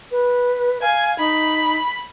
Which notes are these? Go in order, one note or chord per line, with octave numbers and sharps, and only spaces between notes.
B4
F5 G#5
D#4 B5